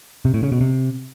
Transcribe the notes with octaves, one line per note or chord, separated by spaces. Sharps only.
C3
A2
C#3
B2
C3